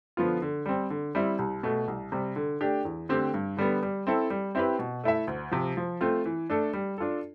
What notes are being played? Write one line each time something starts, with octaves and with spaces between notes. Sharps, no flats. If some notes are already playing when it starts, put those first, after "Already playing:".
D3 F3 B3 F4
D3
G3 C4
D3
G3 C4 E4
C2
B2 A3
C2
C3 G3
D3
A3 D4 G4
E2
D3 A3 C4 G4
G2
D3 G3 B3
G3
C4 E4 A4
G3
C4 E4 G4 B4
B2
A3 E4 A4 E5
D2
C3 F3
F3
A3 C4 F4
E3
A3 D4 A4
G3
D4 F4 A4